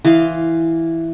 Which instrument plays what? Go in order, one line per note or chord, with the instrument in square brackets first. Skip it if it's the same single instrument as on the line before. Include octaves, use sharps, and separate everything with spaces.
[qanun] E3 D#5 F5 C6